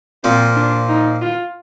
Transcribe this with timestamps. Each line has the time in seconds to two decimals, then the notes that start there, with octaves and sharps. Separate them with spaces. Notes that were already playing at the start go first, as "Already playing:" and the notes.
0.24 A#2 F3 A#3 C4
0.56 D4
0.89 D#4
1.22 F4